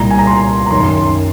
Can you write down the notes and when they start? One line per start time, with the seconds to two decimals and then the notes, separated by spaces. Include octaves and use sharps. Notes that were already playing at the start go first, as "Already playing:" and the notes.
Already playing: C2 A#2 A#5
0.10 G#5
0.19 A#5
0.27 C6
0.66 A#5
0.71 F#2 D#3 C6